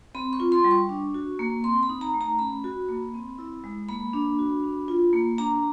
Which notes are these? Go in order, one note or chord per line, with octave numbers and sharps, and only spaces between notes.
C4 B5
C#6
F4
C6
G3
C#6
D4
F#4
A#3
C4 C6
B5
D#4
A#5
A3
A#5
C#4 B5
F#4
A#3
C4
E4
G#3
A#3 B5
D4
F#4
D4
F4
A#3
D4 A#5